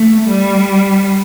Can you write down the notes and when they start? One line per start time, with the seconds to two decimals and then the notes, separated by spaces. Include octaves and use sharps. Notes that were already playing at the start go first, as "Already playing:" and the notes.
Already playing: A3
0.28 G3